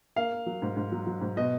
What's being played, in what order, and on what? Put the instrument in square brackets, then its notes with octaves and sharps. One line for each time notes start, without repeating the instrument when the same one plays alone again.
[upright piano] A#3 F5
A#3
F#3
G#2
G#2
F#3
F#3
G#2
B2 D#5